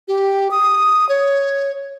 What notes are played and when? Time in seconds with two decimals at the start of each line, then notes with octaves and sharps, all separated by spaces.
0.08 G4
0.51 D#6
1.09 C#5